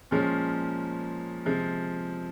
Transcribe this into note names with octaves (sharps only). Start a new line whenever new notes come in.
A#2 F3 G#3 C#4
C3 F3 G#3